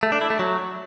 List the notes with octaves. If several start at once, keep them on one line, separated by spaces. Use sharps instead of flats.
A3
D4
E4
A3
F#3